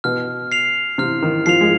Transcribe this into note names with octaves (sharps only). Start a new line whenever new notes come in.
B2 F6
C7 F7
C3 F6
D#3
F3 C7 F7
G#3